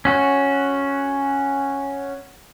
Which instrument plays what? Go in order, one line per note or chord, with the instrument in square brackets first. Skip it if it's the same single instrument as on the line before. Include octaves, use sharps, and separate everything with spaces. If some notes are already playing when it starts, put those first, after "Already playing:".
[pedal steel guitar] C#4 F#4